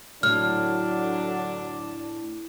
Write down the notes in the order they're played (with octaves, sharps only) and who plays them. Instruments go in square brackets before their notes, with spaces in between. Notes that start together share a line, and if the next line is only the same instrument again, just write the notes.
[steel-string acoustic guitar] A2 [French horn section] D3 F#3 [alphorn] D4 [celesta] F6